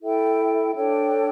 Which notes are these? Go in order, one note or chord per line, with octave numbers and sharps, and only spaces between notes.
E4 A4 E5 G5
D4 A4 C#5 G5